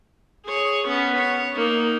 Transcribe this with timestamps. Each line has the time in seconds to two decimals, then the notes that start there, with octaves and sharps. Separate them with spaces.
0.45 G#4 C#5
0.87 B3 C#4
1.18 C#5
1.56 A#3 D#4